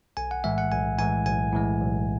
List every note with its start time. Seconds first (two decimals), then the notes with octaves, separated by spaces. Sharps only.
0.17 B1 G#5
0.31 F#5
0.44 A2 E3 G#3 E5
0.58 F#5
0.72 B1 G#5
0.98 A2 E3 G#3 G#5
1.26 B1 G#5
1.53 A2 E3 G#3
1.80 B1